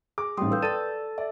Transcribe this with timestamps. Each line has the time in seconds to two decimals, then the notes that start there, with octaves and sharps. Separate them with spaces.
0.18 G#4 D6
0.37 A1 G#2 G3 G5 C6 D#6
0.51 A4 B4 F5 E6 G6
0.62 A4 D5 A6 D#7
1.18 D5 E5